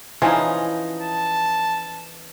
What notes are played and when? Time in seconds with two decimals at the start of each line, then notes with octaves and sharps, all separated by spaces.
0.22 E3 F3 C#4 D#4
1.01 A5